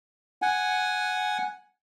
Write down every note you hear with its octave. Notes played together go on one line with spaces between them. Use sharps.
F#5 G#5